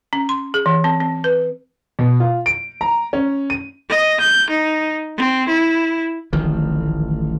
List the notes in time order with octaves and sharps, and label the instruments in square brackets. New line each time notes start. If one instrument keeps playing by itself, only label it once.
[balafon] C#4
C6
G#4
E3
C4
C4
B4
[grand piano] B2
F4
D7
A#5
C#4
D#7
[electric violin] D#5
G6
D#4
C4
E4
[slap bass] D1 A1 D#3 F3